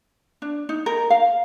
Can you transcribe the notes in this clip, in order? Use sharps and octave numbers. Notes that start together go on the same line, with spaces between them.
D4
D#4
A#4
F5